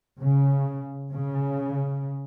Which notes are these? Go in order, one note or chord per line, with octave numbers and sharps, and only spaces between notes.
C#3
C#3